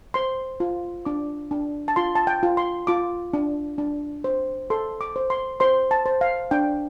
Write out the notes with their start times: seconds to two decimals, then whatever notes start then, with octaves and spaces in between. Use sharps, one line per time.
0.14 C5 C6
0.60 F4
1.05 D4 D6
1.51 D4
1.88 A5
1.96 F4 C6
2.15 A5
2.27 G5
2.43 F4
2.57 C6
2.87 F4 D6
3.33 D4
3.78 D4
4.24 C5
4.70 A4 C6
5.01 D6
5.16 C5
5.30 C6
5.60 C5 C6
5.91 A5
6.06 C5
6.21 F5
6.51 D4 G5